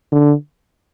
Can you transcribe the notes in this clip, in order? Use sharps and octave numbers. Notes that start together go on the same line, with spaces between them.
D3